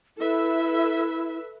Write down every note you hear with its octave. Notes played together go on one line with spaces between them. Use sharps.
E4 A4 B4 E5